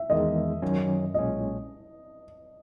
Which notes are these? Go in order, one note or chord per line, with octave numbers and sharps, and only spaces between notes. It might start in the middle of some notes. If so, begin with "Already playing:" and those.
Already playing: E5
E2 D#3 G#3 D#5
F#2 D#3 F#3 C#4
B1 A#2 G#3 C#4 D#5